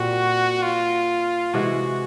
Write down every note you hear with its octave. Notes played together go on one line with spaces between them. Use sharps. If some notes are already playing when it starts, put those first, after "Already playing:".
Already playing: A#2 G3 C4 F#4
F4
C3 E3 G#3 F#4